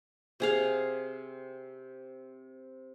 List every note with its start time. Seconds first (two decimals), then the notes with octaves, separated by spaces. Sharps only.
0.40 C3 G#4 F5